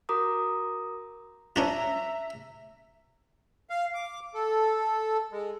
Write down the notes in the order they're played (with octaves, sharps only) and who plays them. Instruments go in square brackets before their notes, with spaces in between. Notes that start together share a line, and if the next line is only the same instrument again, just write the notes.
[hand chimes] F#4 A#4 A#5 D6 D#6
[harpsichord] C#4 D4 F4 [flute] E5 [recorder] A#5
[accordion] F5
D6
A4
G#3